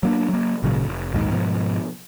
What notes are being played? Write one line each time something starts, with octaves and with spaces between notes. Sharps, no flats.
F#3 A#3 D4
F#3 A#3
G#1 A#2 C#3 F#3
F1
A#1 D#2 G#2 D#3
G#2 B2 D3 F3